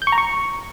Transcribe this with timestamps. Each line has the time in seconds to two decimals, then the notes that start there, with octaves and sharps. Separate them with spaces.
0.02 G6
0.07 C#6
0.12 A#5
0.18 C#6